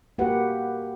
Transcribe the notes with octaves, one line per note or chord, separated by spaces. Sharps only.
A#3 F#4 G4 B4 F#5